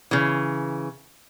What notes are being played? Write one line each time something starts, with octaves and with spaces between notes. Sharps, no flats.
C#3 E3